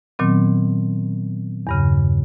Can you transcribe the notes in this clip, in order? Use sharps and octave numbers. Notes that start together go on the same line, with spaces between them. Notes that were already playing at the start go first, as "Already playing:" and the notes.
A#2 D#3 F#3 B3 C4
E2 G2 C#3